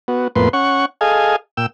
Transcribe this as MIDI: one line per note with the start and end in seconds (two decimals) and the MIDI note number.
0.08 0.28 59
0.08 0.28 66
0.36 0.49 41
0.36 0.49 45
0.36 0.49 58
0.36 0.49 59
0.36 0.49 71
0.36 0.49 84
0.53 0.85 61
0.53 0.85 78
0.53 0.85 85
1.01 1.36 68
1.01 1.36 69
1.01 1.36 75
1.01 1.36 77
1.01 1.36 80
1.57 1.66 46
1.57 1.66 79
1.57 1.66 88